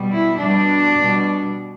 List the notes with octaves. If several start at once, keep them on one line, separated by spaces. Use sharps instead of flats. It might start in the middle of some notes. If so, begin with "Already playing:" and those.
Already playing: B2 G3
E4
B2 G3 D4
B2 G3